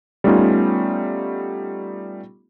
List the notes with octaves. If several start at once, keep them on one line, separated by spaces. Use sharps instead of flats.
G3 A3 B3 C#4 D#4 F4